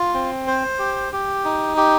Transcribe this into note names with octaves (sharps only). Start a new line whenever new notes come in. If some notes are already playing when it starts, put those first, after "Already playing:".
Already playing: F4
C4
C5
G4
G4
D#4
G4